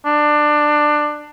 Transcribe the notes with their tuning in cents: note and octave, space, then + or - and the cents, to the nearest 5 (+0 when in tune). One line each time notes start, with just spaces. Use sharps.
D4 +20